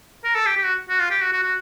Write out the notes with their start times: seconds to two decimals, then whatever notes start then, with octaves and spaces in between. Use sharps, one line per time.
0.24 A#4
0.35 A4
0.46 G4
0.57 G4
0.65 F#4
0.90 F#4
1.00 F4
1.11 G4
1.21 F#4
1.33 F#4
1.43 F#4